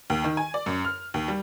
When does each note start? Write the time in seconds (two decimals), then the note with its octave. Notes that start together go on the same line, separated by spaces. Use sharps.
0.10 D#2
0.24 D#3
0.37 G#5
0.54 D5
0.66 F#2
0.85 F6
1.14 D#2
1.28 G3